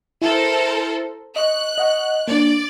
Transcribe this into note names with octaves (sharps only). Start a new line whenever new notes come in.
E4 A4 A#4 C5
D#5 C#6 F#6
D#5 F#5 C#6
A#3 D4 D5